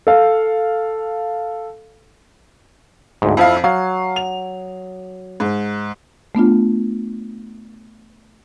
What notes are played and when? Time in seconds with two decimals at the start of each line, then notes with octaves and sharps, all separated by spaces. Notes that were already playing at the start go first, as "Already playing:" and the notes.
0.07 A4 F5
3.22 D2 G#2
3.37 F2 F3 E4 F5
3.64 F#3 F5
4.16 F7
5.40 G#2
6.35 A3 B3 D4 F4